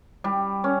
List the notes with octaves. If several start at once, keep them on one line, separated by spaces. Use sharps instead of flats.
G3
C#4